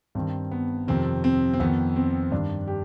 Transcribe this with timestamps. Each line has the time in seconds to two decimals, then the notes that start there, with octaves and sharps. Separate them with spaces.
0.15 G2 D#3 C4
0.51 B3
0.88 F2 C3 D#3 C4
1.24 C4
1.54 C4
1.60 F2 D#3 B3
1.96 C4
2.31 G2 D#3 D4
2.68 G4